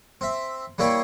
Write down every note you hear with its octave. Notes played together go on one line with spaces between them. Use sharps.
C4 E5
G3 A#3 E4 C#5 G5 C6